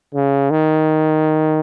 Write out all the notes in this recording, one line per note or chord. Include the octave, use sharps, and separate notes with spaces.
C#3
D#3